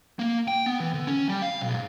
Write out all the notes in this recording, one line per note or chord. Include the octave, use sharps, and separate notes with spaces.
A#3
G5
B3
E3
D3
C#4
G3
F5
B1
G#2